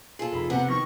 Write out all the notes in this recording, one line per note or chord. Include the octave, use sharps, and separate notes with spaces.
F4 G#4 A4
F1 A#5 B5
C3 B3 C4 F#5 A#5
D#3 E3 C#6 F6 A#6